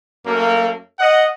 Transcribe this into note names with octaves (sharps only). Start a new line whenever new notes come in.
F#2 A3 A#3
D#5 F#5